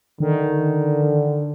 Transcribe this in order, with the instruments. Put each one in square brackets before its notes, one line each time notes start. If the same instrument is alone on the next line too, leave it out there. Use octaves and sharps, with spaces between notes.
[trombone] D3 [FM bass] D#3